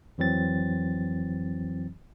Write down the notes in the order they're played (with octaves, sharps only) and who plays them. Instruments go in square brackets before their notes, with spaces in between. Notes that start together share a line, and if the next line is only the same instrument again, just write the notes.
[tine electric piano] F2 E3 F#3 C4 A6